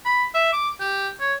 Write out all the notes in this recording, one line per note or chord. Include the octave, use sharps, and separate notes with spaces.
B5
E5
D6
G4
C#5